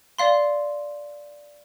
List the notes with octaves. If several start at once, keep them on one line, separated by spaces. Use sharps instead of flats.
D5 F5 C6